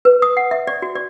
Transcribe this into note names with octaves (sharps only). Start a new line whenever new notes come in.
B4
D#6
F#5
E5
D5
F#4
D5